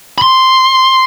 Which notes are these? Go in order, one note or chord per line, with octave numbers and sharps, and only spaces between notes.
B5 C6